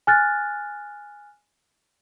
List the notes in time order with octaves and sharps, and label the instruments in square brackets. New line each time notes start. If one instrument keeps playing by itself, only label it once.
[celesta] G#5 F6 F#6 A6